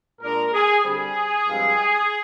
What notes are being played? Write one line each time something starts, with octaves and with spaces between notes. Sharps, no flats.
A#2 G#3 D4 A#4
G#4
D3 G3 C4 G#4
G2 F3 G#3 C4 F4